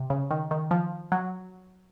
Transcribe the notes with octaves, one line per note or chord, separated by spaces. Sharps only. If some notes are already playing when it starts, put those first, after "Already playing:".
Already playing: C3
C#3
D#3
D#3
F3
F#3